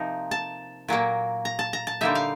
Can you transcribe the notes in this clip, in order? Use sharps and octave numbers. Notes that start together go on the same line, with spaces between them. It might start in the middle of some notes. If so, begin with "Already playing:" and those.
Already playing: C3 F3 A#3 D#4
A5
A#2 F#3 A#3
A#5
A5
A#5
A5
D3 G3 A#3 D#4 E5
F5